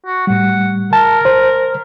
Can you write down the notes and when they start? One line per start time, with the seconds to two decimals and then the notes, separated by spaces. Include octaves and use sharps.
0.06 F#4
0.27 A2 G3 F#5
0.93 A#4 A5
1.25 C5